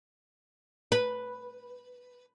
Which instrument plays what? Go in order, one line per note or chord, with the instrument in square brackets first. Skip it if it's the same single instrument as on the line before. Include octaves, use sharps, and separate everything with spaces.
[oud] B4